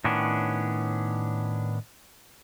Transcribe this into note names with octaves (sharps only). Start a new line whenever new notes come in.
A2 D#3 B3 C#4 D4